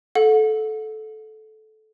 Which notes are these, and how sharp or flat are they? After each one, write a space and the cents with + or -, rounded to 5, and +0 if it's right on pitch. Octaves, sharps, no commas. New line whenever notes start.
A4 -20 F#5 -35